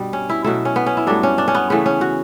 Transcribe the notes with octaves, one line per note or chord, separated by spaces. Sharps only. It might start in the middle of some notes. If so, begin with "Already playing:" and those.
Already playing: G2 B2 G3
C#4
E4
B2 F#3 A3 E4
C#4
B3
C#4
E4
G2 F#3 A3 D4
C#4
D4
C#4
B3
C#3 E3 A3 B3
C#4
F#4